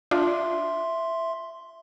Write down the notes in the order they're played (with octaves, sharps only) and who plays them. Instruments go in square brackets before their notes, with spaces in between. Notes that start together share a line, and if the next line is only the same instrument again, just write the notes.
[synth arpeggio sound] D4 F4 [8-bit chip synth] E5 C6